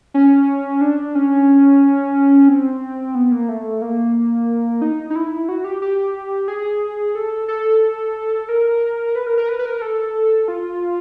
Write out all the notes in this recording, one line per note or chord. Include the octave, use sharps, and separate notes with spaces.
C#4
D4
C#4
C4
B3
A#3
A3
A#3
D#4
D#4
E4
F#4
G4
G4
G#4
A4
A4
A#4
B4
A#4
A#4
B4
B4
A#4
A4
F4